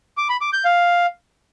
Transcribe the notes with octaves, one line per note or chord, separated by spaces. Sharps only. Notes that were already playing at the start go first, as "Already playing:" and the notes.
D6
B5
D6
G6
F5